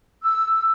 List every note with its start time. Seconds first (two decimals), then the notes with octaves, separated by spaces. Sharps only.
0.23 E6